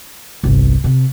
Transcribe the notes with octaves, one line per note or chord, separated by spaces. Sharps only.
G1 C2
C3